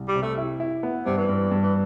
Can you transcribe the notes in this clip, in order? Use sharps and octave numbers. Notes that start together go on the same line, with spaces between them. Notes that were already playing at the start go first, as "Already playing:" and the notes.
Already playing: C2
G3
C3
A3
E4
E4
B3
G2 C3
E3
G2
G2
E3